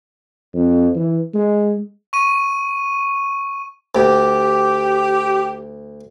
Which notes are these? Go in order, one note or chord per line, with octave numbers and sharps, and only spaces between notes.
F2
E3
G#3
C#6 D#7
D2 G4